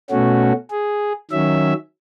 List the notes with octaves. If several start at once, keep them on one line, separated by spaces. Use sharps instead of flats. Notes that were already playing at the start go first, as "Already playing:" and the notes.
B2 A3 C#4 F#4
G#4
D#3 F#3 C#4 E5